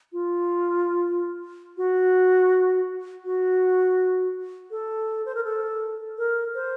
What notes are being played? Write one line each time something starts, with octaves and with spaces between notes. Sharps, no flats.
F4
F#4
F#4
A4
C5
A#4
A4
A#4
C5